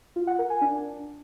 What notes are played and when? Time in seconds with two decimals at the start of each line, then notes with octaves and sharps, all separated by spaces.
0.16 F4
0.27 F#5
0.39 A#4
0.50 G#5
0.61 D4